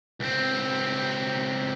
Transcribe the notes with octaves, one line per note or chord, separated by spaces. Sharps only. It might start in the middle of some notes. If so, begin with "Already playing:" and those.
C#2 C4